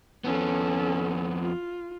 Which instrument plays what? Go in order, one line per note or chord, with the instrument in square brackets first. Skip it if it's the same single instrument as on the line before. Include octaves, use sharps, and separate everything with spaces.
[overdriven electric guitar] F2 B3 [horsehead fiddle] C#4 A4
[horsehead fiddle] F4